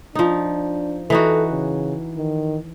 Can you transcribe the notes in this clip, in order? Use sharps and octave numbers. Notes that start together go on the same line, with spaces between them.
F3 D4 D#4
E3 D#4 F#4 A4
C#3
D#3